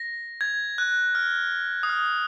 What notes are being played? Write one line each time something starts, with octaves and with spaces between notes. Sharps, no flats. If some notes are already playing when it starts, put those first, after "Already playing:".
Already playing: A#6
G#6
F#6
F6
D#6
F6